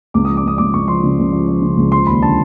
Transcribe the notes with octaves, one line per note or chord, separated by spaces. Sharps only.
C#2 D6
F3 D#6
D6
C#2 D#6
C#2 D6
C#2 C#6
F3 C6
C#3
C#2
F3
F3
C#3
C#2
F3 C6
D#2 B5
D3 A5